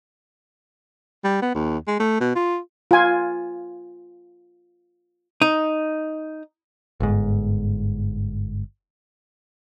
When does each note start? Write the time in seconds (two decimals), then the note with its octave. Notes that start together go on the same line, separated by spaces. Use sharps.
1.24 G3
1.42 B3
1.55 D#2
1.87 G#3
1.99 A3
2.20 B2
2.35 F4
2.91 F4 G#5
5.42 D#4
7.00 G1 G#2